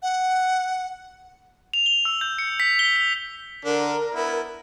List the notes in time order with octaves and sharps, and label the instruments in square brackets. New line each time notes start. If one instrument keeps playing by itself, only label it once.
[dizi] F#5
[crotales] F7
G7
E6
G6
C#7
B6
G7
F7
[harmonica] D3 D4 [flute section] A#4
[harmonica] B3 E4